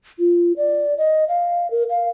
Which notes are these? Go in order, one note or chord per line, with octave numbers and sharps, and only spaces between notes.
F4
D5
D#5
F5
A#4
F5